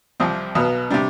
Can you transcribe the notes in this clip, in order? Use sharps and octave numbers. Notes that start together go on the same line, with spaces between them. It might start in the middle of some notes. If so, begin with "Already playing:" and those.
C2 C3 F3 C4
B1 B2 B3
C3 G3 D4